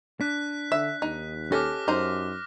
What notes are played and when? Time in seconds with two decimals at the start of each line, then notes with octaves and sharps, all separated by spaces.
0.21 D4 F#6 B6
0.72 D3 E5
1.02 D#2 D#4
1.52 C#4 G4 A4 D#5 D6 F6 A#6
1.88 F#2 D#4 C5